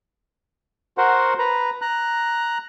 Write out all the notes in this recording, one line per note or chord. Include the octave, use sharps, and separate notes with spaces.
F#4 A#4 C5 F#5
B4 A#5
A#5 F#6